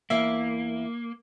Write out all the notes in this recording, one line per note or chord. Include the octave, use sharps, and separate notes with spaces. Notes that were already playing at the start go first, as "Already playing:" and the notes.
E2 A#3 E4 E5